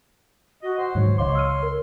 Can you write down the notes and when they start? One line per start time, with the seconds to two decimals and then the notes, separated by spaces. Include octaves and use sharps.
0.63 F#4 D#5
0.78 C5 F#5
0.95 G#2 D#3 F#3 C#5
1.18 C#2 C#5 D#5 F5 C6 D6
1.35 E6 F6 D#7
1.62 A#4